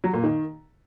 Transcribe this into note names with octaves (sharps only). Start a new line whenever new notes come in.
F#3
A#2
D#3